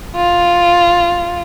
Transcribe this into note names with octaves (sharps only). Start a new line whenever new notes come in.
F4